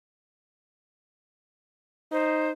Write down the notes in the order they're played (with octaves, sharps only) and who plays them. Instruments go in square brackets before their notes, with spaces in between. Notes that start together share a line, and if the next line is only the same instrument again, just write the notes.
[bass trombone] D#4 [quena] C5